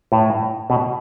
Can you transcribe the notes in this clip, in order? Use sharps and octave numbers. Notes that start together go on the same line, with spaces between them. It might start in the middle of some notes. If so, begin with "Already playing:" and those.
A2
B2